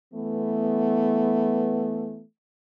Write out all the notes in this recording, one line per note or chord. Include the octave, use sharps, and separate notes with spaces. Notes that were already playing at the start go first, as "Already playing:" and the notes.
E3 A3 B3